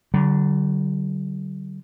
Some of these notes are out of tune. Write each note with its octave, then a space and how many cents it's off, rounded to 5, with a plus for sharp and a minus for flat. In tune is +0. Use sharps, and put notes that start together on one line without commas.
D3 +0 F#3 +45